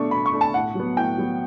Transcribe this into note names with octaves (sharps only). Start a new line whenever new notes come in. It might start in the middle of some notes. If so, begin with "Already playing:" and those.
Already playing: B2 A3 D4 C#6
B2 B5
C#6
A3 D4
A5
A2 F#5
F#3 B3
A2 G5
F#3 B3